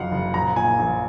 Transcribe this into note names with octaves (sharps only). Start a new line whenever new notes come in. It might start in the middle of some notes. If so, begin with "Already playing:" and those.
Already playing: F#1 F2 F#3 F5 F#5
F#1
A#1 A#5
A#2 G#5
A#1